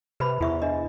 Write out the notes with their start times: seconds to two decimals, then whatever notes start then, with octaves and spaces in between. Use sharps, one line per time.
0.20 C3 B4 C5 B5
0.41 E2 E4 E5 C#6
0.62 D4 D#5